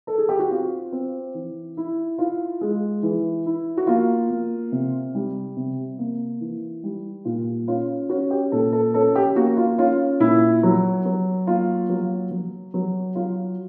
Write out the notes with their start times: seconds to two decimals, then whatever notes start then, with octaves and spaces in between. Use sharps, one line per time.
0.07 A4
0.18 G#4
0.29 G4
0.39 F#4
0.51 C4 F4
0.92 C4
1.34 E3
1.77 E4
2.18 E4 F4
2.61 G#3
3.03 E3
3.46 E4
3.77 F#4
3.87 A#3 F4
4.30 A#3
4.72 C3
5.15 G3
5.57 C3
5.98 A#3
6.41 E3
6.84 G3
7.25 A#2 F4
7.68 C#4 F4
8.09 C#4 F#4
8.31 G4
8.52 A#2 A4
8.73 A4
8.94 C#4 A4
9.16 G4
9.36 A#3 F#4
9.57 F4
9.78 C#4 F4
10.20 A#2 E4
10.63 F#3
11.05 F#3
11.47 A#3 F4
11.89 F#3
12.31 F#3
12.74 F#3
13.15 F#3 F4